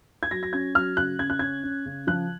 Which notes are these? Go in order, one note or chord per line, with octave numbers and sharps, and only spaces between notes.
G#6
F#3 A#6
A#6
C#4 G#6
F#3 F6
C#3 F#6
C#3 G#6
F#6
C#4 G#6
C#4
C#3
F3 F#6